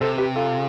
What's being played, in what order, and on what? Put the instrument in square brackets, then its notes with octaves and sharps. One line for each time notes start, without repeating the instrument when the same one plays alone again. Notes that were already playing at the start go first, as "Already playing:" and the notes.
[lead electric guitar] C3 [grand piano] A4 C5
[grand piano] G4 B4
F4 A4